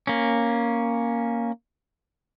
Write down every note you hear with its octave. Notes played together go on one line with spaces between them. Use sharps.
A#3 C#4